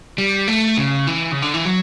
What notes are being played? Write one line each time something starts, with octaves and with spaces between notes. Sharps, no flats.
G3
A3
C#3
E3
C#3
D3
E3
F#3